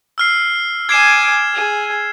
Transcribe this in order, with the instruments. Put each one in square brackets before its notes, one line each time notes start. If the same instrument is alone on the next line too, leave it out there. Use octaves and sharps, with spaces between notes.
[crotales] E6 F6 C7
[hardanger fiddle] G#5 D6 [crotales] G#6 C7 E7
[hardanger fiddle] G#4